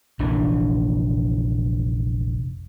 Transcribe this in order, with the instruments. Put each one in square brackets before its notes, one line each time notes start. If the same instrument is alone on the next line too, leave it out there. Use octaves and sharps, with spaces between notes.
[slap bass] F1 A#1 E3 D4